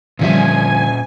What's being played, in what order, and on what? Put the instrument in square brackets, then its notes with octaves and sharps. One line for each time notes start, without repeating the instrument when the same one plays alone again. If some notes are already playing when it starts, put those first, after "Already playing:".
[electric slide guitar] A#2 C#4 E5 [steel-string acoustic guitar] D3 F3 G3 [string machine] G#5